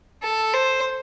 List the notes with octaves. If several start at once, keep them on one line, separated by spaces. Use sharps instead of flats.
A4
C5